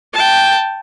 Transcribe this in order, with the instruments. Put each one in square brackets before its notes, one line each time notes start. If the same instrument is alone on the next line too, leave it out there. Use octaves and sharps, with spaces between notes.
[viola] G5 A5